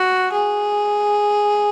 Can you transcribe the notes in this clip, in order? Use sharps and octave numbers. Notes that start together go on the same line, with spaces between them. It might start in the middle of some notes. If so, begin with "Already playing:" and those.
Already playing: F#4
G#4